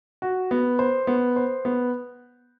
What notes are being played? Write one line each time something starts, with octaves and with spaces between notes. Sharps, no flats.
F#4
B3
C5
B3
C5
B3